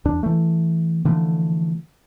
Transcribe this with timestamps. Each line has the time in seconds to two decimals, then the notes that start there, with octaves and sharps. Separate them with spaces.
0.05 E2 D4
0.23 E3 A3
1.05 D3 E3 F3 A3